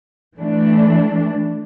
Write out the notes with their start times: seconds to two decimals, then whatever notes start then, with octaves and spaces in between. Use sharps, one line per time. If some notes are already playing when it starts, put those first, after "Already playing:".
0.37 E3 A3 D4